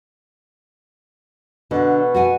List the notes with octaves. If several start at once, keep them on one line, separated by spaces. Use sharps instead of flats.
B2 D3
F#4 F#5 G#5